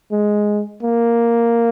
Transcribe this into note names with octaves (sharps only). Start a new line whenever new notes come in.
G#3
A#3